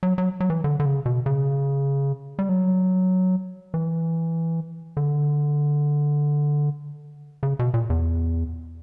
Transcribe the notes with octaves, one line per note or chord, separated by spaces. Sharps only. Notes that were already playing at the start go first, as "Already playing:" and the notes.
F#3
F#3
F#3
E3
D3
D3
C#3
B2
C#3
G3
F#3
E3
D3
C#3
B2
A#2
E2